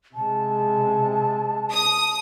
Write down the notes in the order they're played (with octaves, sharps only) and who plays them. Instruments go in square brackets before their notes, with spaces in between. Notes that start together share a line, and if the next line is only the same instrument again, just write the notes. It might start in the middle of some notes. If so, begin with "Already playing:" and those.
[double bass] C3 G#3 [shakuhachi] A5
[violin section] D#6